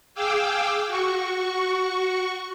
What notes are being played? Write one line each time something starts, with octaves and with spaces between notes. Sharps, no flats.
G#4 F5 G5 D6 E6
F#4 C#6